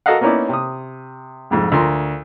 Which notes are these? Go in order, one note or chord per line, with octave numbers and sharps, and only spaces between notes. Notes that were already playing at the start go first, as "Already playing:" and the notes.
F#4 A4 A#4 D#5 F5 F#5
A#3 B3 C#4 D#4 E4 D5
C3 D#6
C2 F2 G#2
D2 F4 A#4 C6